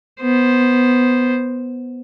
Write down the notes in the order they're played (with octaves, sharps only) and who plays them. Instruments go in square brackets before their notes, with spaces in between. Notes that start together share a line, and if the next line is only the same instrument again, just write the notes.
[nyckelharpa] B3 C5